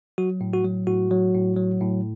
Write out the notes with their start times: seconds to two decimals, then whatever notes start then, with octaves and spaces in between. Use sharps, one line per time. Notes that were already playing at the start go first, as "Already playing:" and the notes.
0.18 F#3 F#4
0.41 A2
0.53 F#4
0.65 F#3
0.87 A2 F#4
1.11 F#3
1.34 A2
1.57 F#3
1.81 A2